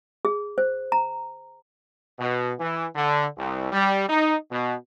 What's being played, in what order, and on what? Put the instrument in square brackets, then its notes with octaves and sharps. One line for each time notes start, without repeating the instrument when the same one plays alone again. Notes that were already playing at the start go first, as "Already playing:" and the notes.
[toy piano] G#4
C5
A#5
[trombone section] B2
E3
D3
C2
G3
D#4
B2